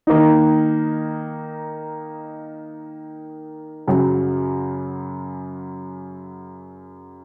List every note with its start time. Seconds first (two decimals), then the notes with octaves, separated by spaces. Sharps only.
0.07 D#3 A#3 D#4
3.88 F#2 C#3 F#3